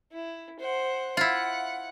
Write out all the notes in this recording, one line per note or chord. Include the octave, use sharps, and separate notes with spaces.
E4
C5 F#5
E4 F4 F#5